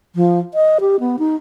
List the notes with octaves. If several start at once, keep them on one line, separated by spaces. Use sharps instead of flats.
F3
D#5
G4
B3
D#4